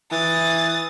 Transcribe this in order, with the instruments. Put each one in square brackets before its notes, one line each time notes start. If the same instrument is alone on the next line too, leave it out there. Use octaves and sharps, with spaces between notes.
[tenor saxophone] E3 [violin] D#6 A6